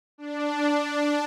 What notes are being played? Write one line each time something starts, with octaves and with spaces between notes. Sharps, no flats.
D4